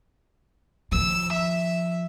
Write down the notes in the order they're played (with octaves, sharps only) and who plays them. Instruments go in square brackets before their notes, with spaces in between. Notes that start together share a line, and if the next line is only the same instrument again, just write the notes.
[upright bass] D#3 F3 [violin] E6
[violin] E5